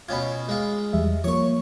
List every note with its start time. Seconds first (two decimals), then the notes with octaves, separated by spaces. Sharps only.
0.09 B2 C#4 F4 B5 G#6
0.49 G#3 F4
0.93 E2 G3 E5
1.24 F3 A#3 C#5 C#6